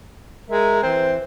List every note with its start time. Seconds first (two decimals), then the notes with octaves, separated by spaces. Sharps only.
0.50 G#3 A#4 E5
0.83 E3 C4